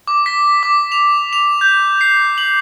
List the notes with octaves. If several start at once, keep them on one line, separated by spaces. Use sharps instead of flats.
D6
B6
D6
F7
F7
G6
C7
F#7